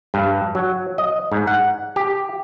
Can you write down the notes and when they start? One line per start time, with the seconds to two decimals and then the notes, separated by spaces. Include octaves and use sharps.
0.14 G2
0.55 F#3
0.98 D#5
1.32 G#2
1.47 F#5
1.96 G4